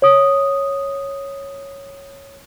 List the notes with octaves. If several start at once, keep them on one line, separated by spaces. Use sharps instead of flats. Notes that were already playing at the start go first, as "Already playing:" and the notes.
C#5 D#6